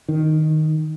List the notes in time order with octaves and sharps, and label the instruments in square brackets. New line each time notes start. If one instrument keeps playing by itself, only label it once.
[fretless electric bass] D#3